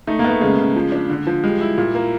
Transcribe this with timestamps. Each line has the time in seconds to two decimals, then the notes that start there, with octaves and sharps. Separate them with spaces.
0.07 A3 D#4
0.19 A#3
0.24 B3
0.30 A3
0.41 C#3 G#3
0.58 C#3
0.76 F3
0.92 D4
1.10 D3
1.27 F3
1.43 G3 G#3
1.61 E4
1.78 A#2
1.95 A#3